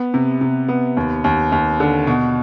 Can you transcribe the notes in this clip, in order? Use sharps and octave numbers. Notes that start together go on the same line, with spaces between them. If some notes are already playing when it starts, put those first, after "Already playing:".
Already playing: B3
C3
C3
B3
D#2
D#2
D#2
D3
B2